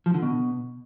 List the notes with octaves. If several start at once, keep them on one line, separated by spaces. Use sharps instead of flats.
F3
D3
B2